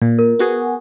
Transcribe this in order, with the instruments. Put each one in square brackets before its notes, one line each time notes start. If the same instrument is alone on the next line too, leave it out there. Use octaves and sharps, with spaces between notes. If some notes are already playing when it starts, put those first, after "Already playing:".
[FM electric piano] A#2
[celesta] A#4
[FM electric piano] B3 F#4 G#4